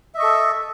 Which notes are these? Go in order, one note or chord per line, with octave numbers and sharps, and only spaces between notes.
A4 D#5 E5 C#6